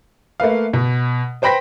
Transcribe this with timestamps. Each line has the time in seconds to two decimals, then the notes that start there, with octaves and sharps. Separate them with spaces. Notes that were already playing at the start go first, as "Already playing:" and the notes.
0.40 A3 A#3 B4 F5
0.73 B2
1.42 B4 C5 G5 B5 A#6 B6